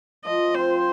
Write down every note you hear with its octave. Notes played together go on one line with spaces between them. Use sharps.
F3 D#5
C4 F4 C5